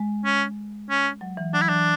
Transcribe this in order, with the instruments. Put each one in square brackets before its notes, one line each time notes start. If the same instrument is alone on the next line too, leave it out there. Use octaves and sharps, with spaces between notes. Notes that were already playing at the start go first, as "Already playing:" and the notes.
Already playing: [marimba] G#3
[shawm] C#4
C#4
[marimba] F#3
E3
[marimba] F#3 [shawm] D4
[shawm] E4
[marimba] E3 [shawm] D4